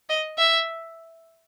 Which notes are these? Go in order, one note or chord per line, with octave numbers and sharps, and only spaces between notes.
D#5
E5